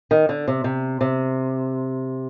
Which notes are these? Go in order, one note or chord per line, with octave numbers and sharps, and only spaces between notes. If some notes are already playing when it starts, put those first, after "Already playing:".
D#3
D3
C3
C3
C3